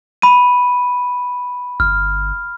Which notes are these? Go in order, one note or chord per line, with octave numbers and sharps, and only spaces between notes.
B5 D#7
G1 F6